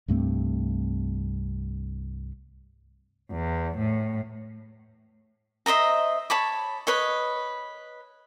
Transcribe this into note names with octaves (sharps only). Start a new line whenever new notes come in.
C2 G2 A3 C4
E2
A2
C5 D#5 E5 A#5
C#5 A5 B5 D6
B4 C#5 D#5